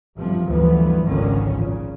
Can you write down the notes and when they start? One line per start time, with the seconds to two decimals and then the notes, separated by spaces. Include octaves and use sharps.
0.17 G1 C3 F3
0.47 G1 D2 E3 F3 B3
1.03 G#1 C#2 D3 D#3 F3 C#4
1.55 A#2 C#3